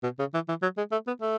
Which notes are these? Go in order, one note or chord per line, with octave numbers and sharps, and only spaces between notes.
B2
C#3
E3
E3
F#3
G#3
A3
B3
A3